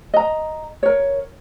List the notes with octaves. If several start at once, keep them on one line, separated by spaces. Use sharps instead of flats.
D#5 A#5
A#4 C#5